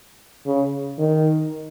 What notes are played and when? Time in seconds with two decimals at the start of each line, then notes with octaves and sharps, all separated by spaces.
0.46 C#3
0.99 D#3